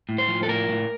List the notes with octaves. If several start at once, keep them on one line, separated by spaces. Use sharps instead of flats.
A2
C5
F3
A4
A2 A#4
A2